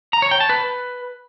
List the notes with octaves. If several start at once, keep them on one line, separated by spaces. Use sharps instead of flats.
A#5
C#5
G5
A5
B4